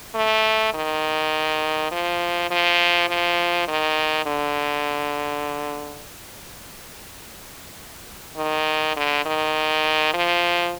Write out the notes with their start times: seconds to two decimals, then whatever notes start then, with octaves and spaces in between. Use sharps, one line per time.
0.15 A3
0.74 D#3
1.92 F3
2.51 F3
3.09 F3
3.68 D#3
4.26 D3
8.37 D#3
8.96 D3
9.26 D#3
10.14 F3